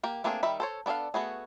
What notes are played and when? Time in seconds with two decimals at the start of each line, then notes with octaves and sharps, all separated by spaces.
0.03 A#3 G4
0.24 A3 A#3 C4 D4 G#4
0.43 D#3 G3 E5 B5
0.60 A4 C5 C#5
0.86 B3 D4 G#4 A4 F5
1.14 A3 B3 F#4 G#4